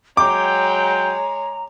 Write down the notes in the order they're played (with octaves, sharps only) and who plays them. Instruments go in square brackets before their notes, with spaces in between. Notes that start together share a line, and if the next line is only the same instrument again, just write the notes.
[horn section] F#3 G5 [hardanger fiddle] G#3 C#5 [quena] A#5 [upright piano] D6